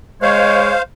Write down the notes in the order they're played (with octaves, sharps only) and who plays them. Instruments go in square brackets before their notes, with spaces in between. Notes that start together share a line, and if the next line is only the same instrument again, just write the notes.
[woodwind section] G#3 C#5 [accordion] C5 F5